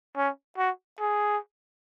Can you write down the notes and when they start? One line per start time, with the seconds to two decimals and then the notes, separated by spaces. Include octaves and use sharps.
0.17 C#4
0.58 F#4
1.00 G#4